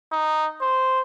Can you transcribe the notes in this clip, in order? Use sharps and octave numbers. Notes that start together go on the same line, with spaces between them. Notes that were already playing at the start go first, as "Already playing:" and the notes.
D#4
C5